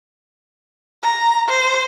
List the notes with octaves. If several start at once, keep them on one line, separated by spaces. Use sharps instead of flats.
A#5
C5